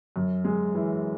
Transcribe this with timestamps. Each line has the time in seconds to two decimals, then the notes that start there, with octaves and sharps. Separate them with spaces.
0.16 F#2
0.44 G#3
0.75 E3